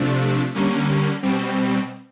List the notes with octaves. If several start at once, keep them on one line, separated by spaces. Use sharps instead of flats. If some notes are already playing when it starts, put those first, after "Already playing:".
Already playing: C3 F3 A3 D4
D3 G3 A#3 C#4
B2 G3 C4